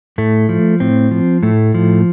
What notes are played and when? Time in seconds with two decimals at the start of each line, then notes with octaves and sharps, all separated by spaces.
0.18 A2 A3
0.49 F3
0.80 A2 C4
1.11 F3
1.43 A2 A3
1.74 F3